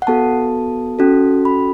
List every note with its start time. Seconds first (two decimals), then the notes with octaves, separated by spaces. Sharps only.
0.02 F#5
0.07 B3 F#4 A4 A5
0.99 C#4 F#4 A4
1.45 B5